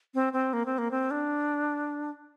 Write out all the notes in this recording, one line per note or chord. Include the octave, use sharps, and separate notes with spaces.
C4
C4
A#3
C4
A#3
C4
D4